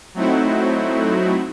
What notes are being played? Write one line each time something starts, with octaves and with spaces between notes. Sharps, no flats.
F#3 A3 C4 D#4 E4 F#4